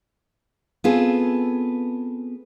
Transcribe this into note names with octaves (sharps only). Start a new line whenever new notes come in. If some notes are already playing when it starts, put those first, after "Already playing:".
B3 C4 F4 G#4 A4